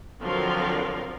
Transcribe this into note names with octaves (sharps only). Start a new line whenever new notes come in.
D3 F3 F#3 C4 A#4 F5